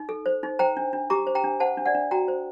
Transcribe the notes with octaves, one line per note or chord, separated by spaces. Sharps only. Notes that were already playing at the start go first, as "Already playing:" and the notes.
Already playing: D#4
A4
C5
D#4
C5 G5 A#5
D4
D4
G4 A#5 D6
C5
G5 A#5
D4
C5 F#5 A5
D4
D5 F#5
D4
F#4 G5 A#5
C5